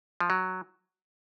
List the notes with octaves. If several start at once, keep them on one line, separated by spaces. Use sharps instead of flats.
F3
F#3